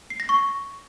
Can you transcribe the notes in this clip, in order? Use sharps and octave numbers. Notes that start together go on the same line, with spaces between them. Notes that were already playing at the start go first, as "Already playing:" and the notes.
C7
A#6
C#6